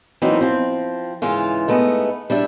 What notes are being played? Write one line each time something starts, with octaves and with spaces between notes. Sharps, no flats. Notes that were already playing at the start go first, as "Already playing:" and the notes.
E3 F#3 A#3 C4 D#4
F3 C4
G#2 C#3 E3 F4
G#2 A3 B3 D#5
G3 D4 E4 E5